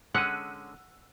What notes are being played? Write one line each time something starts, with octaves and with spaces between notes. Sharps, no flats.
D3 G#3 C#4 F#5 E6 F#6 D#7